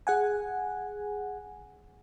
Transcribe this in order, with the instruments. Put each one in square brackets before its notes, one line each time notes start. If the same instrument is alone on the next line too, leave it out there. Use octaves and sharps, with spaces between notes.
[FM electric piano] G#4 F#5 G#5